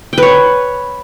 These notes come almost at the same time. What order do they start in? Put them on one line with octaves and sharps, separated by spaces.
G5 B4 C#5